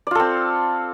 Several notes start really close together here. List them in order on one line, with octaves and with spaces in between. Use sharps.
D5 F4 A4 C4